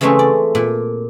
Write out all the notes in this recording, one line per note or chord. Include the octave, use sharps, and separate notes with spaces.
C#3 E3 G#3 A3 C4 C#4
D5
A#2